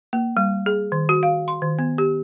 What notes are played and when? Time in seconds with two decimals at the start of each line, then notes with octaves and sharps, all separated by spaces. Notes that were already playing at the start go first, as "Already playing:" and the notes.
0.13 A#3
0.37 G3
0.66 G#4
0.92 D#3
1.09 F#4
1.23 F5
1.48 C6
1.62 D#3
1.79 B3
1.98 G4